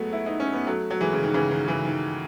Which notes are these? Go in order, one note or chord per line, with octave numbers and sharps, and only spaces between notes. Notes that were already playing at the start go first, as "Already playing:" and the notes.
Already playing: F#3 G#3 A3 B3
E4
D#4
C#4
B3
F#3 A3
F#3
E3 G#3
C#3
D#3
C#3 E3
D#3
C#3 E3
D#3